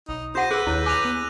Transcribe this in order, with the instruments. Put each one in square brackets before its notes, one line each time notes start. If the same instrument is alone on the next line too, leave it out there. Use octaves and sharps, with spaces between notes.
[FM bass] B1 [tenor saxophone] D#4
[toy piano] F4 G4 F#5 [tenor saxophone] C5 [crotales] G6 A#6 D#7
[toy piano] G#4 [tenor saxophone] B4 [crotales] E6 F#6
[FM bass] D#2 [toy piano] E4 C#5
[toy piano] G#5 D6 [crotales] A#6 D#7 F7
[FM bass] B3